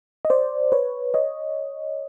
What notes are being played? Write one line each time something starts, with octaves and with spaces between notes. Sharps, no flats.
D#5
C5 D5
B4 C#5
C#5 D#5